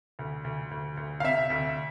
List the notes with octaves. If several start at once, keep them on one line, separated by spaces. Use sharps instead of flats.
D2
D2
D2
D2
F5
C3 E5
D2